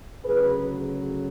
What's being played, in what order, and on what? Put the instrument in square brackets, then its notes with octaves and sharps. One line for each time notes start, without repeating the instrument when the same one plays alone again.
[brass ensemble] D2 C#3 F#3 G#4 B4